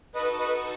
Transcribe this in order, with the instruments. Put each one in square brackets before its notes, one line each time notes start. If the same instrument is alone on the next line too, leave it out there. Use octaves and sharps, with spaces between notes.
[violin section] D#4 F#4 A4 [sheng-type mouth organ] B4 D#5
[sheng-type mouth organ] B4 D#5